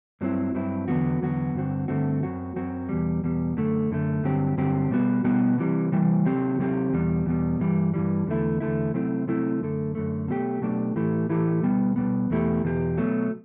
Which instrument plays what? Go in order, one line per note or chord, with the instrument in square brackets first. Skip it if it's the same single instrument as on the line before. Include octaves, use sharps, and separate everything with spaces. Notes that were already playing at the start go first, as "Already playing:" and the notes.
[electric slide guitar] G2 F#3 C4 E4
G2 F#3 C4 E4
E2 D3 F#3 B3 F#4
E2 D3 F#3 B3 F#4
G2 D3 A3 C4 F#4
G2 D3 A3 C4 F#4
F#2 F#3 C4 F#4
F#2 F#3 C4 F#4
E2 B2 G3
E2 B2 G3
F#2 D3 A3
F#2 D3 A3
G2 D3 F#3 C4 G4
G2 D3 F#3 C4 G4
B2 G3 B3 F#4
B2 G3 B3 F#4
C3 E3 G3
C3 E3 G3
C3 F#3 C4 G4
C3 F#3 C4 G4
E2 B2 G3
E2 B2 G3
G2 E3 G3
G2 E3 G3
E2 D3 A3 E4
E2 D3 A3 E4
C3 F#3 A3 C4 E4
C3 F#3 A3 C4 E4
F#2 D3 A3
F#2 D3 A3
B2 F#3 A3 D4 G4
B2 F#3 A3 D4 G4
A2 E3 A3 E4 G4
A2 E3 A3 E4 G4
B2 G3 B3
B2 G3 B3
E2 B2 A3 E4 G4
E2 B2 G4
B2 F#3 A3